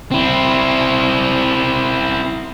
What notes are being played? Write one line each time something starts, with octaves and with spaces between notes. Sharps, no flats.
C4 E4